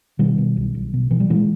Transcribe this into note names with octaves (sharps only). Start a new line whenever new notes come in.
B2 D#3 G3
B2
B1
B1
B2
B2 E3
G3
A#2 E3 G#3